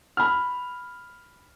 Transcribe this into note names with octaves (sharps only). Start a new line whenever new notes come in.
B5 F6